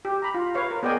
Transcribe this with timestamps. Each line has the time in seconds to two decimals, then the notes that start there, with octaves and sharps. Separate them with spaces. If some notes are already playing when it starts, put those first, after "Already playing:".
0.05 G4
0.22 A#5 B5
0.35 F4
0.55 B4 C#5 F5
0.71 A#4
0.83 B3 G#4 D5 D#5 G5 G#5